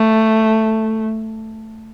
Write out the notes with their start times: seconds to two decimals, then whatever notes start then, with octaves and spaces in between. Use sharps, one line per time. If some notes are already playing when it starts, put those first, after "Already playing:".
Already playing: A3